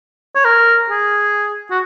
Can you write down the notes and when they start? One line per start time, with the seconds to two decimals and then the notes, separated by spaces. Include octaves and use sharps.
0.35 C#5
0.45 A#4
0.90 G#4
1.71 F#4